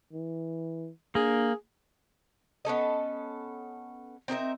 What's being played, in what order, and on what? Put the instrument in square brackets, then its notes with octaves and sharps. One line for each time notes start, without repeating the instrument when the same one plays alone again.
[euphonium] E3
[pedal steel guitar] A#3 [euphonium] D4 [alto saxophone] G#4
[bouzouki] B3 C#4 A4 D#5
C4 D#4 A#4 E5